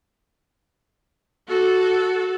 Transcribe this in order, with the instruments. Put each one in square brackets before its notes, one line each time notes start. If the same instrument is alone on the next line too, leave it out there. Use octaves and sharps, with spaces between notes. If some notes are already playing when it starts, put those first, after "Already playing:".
[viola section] F#4 A4